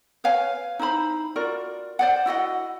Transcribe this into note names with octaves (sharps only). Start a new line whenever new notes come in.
B4 C#5 F5 G#5
D#4 E4 C5 B5
F4 F#4 A#4 D5
C5 D5 F#5
E4 F#4 D#5 F#5